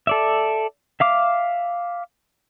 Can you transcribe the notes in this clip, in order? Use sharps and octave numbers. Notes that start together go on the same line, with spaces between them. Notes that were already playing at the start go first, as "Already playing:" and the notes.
A4 D5 E5
E5 F5 D6